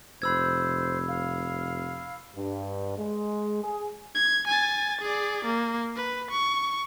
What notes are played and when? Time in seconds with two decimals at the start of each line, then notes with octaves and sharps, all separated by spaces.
0.22 F1 C5 B5 E6 G#6
1.08 F5
2.36 G2
2.98 G#3
3.64 G#4
4.15 G#6
4.47 G#5 A6
5.01 G#4 D5
5.45 A#3
5.96 B4
6.31 C#6